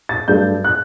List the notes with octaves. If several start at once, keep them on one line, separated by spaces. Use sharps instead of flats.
A6
G2 F#3 A3 G6
F#6